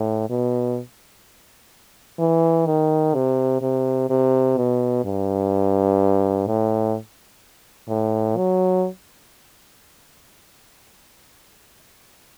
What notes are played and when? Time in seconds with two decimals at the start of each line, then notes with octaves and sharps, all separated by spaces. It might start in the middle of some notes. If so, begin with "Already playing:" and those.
Already playing: A2
0.29 B2
2.19 E3
2.66 D#3
3.15 C3
3.61 C3
4.10 C3
4.57 B2
5.05 G2
6.47 A2
7.89 A2
8.37 F#3